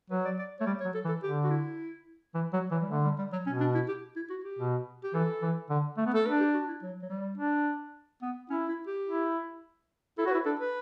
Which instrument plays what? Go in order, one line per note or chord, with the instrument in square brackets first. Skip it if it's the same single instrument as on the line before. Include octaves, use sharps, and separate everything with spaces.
[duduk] F#3 [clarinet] B4
[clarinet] D5
D5
[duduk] A3 [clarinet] C#5
[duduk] G3 [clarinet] D5
[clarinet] C#5
[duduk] F#3
[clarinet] A4
[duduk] E3
[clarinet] A4
[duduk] D3 [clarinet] G4
[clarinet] F#4
E4
[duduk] E3
F#3
[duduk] E3 [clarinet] F#3
[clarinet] G3
[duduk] D3 [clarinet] A3
[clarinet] G3
G3
F#3
[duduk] B2 [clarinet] C#4
[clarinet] D4
E4
G4
E4
F#4
G4
[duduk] B2
[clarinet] G4
[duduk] E3 [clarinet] A4
[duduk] E3
D3
A3
B3
[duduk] A3 [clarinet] A4
[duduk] D4 [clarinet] B4
[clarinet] G4
F#4
E4
F#3
F#3
G3
[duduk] D4
[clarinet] B3
[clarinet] C#4 [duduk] E4
[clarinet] E4
G4
[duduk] E4
[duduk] E4 [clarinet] A4
[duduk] F#4 [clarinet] C#5
[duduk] E4 [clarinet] B4
[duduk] D4 [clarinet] A4
[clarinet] B4